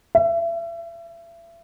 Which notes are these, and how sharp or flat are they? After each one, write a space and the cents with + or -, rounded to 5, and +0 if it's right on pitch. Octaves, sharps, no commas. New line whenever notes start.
E5 +35